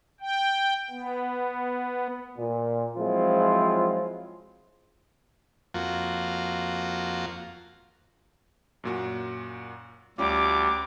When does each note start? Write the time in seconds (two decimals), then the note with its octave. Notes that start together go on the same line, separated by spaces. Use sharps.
0.21 G5
0.90 B3
2.38 A#2
2.97 F3 F#3 G#3 C4 E4 F4
5.74 F2 A#3 F4 F#4
8.84 F#2 A#2 F#4
10.18 D2 G3 C#4 F4 D6